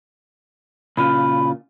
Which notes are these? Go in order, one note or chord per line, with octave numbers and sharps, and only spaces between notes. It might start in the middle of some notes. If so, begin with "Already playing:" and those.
A#2 C#3 F4 B5